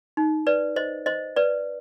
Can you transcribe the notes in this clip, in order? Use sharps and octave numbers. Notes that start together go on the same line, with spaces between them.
D#4
B4 D5
C5 D#5
C5 D#5
B4 D5